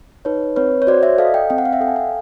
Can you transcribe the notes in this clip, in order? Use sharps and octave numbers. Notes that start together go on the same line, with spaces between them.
D#4 B4 C#5
C4 B4 C#5
C#5
F#4 C5 D5
D5 E5
A4 D#5 F5
F5 G5
C4 G5
F#5
F5
E5 F#5
A4 G5
G#5
F5 G5